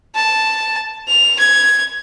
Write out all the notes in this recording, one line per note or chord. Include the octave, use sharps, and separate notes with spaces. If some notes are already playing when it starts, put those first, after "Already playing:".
A5
F7
G#6